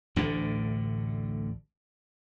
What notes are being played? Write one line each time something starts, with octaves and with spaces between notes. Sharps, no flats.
A1 D2 A2 D3